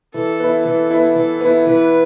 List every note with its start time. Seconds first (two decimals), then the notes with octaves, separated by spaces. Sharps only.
0.14 E3 A4
0.40 B3 E4
0.65 E3 A4
0.90 B3 E4
1.15 E3 A4
1.41 B3 E4
1.66 E3 B4